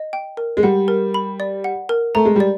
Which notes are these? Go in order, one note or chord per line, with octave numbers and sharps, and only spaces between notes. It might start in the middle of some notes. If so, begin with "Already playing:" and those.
Already playing: D#5
G5
A#4
G#3
G3 F#5
A#4
B5
D5
F#5
A#4
A3 A#5
G#3
G3 D5